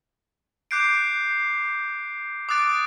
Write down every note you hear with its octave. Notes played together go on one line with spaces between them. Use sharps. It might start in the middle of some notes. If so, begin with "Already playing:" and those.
D6 F#6 G6 C7 D7
D6 D#6 F#6 A6 D7